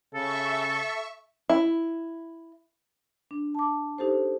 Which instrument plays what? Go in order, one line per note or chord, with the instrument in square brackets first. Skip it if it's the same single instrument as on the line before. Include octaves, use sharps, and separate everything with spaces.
[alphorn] C#3 [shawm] A4 [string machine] E5 C#6
[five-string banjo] E4
[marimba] D4
A5 D6
D#4 G4 A4 C5